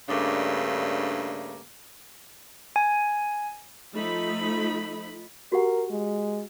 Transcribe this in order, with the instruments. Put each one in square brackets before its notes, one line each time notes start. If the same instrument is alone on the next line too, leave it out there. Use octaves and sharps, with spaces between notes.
[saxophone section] G2 C#3 A3 A#3 D4
[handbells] G#5
[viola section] F3 A3 D#4 B5
[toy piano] F#4 G4 F#5 [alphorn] A#4
[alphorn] G#3